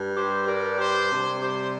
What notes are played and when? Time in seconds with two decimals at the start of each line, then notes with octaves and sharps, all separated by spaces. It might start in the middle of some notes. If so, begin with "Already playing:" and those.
Already playing: G2 G3
0.16 G4 C5
0.47 A#4 D5
0.78 G4 C5
1.09 C3 G3
1.41 G4 C5